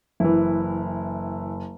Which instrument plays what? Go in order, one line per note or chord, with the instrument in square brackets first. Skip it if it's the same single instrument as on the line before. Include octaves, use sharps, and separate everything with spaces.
[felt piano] F#1 [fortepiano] E3 E4